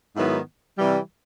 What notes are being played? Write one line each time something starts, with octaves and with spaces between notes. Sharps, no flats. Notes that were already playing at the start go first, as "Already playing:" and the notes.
G#2 D#3 F#3 B3 E4
C3 E3 G3